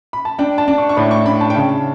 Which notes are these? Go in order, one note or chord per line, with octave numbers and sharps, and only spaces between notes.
B5
A5
D4 G5
A5
D4
C#6
C#6
A2 B5
C#6
D4 B5
A5
G5
C#3 A5